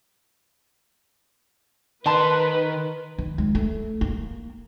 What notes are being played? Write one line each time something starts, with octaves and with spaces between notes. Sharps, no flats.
D#3 B4 C5 A5 C6
D#3
C#2
A3
A#3